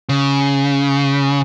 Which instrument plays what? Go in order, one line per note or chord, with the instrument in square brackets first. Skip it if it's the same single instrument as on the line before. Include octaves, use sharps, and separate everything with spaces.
[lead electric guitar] C#3